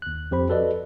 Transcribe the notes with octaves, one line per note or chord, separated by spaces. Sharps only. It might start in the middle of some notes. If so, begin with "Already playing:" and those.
D#2 F#6
F2 G4 C5 B5
F#4 A4 B4 D5 D#5